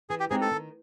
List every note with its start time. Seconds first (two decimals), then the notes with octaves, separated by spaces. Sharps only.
0.10 E3 G#4
0.20 G4
0.30 G#3 C4 D#4 G4 G#4
0.41 A4
0.51 D#3